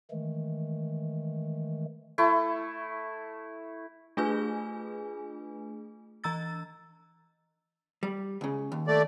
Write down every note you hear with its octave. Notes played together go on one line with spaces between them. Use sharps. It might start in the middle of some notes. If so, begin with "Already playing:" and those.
D#3 E3 G#3 A3
A3 E4
A3 D4 F4 G#4 B4 G#5
E3 A#5 E6 A6
G3
C#2 C#3
D#2
A3 D5